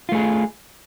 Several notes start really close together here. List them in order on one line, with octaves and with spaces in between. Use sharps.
F4 A3 G#4